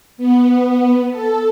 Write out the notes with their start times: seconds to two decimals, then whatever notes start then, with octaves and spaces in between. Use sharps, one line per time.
0.17 B3
1.11 A4